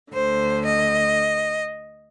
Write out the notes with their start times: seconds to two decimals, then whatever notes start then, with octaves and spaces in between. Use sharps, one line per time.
0.12 D2 D3 C5
0.64 D#5